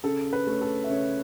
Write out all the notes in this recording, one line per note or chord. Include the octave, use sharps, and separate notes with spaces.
C#3 A4
B4
A3 C#4
A4
E5
C#3 C#5